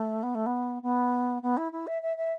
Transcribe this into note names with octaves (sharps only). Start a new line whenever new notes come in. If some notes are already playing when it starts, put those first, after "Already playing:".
Already playing: A3
B3
A3
B3
B3
B3
E4
E4
E5
E5
E5